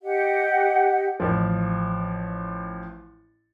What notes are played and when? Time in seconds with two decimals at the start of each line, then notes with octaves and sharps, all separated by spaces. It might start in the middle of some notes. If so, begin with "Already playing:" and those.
0.02 G4 D#5 F#5
1.20 A1 F3